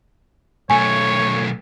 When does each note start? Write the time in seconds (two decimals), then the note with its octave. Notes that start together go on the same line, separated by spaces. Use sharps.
0.70 B1 A3 C#5 G#5